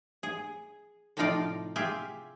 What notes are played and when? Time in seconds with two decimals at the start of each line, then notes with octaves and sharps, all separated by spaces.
0.23 G#4
1.17 A2 C3 F3 D#4 F4 D5
1.76 F4 G4 G#4 E5